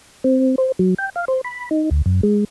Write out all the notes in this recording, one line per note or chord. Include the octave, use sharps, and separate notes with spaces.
C4
C5
F#3
G5
F5
C5
B5
D#4
D2
F#2
G#3